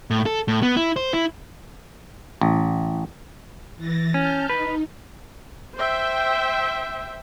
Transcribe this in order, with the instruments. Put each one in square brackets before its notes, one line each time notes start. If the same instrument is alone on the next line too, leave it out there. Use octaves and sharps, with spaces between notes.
[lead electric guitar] A2
A4
A2
B3
E4
C5
E4
[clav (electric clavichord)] A1
[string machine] E3 A6 A#6
[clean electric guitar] C#4 [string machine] A5 F6 G6
[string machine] D#4 [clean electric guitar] B4
[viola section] C5 E5 G5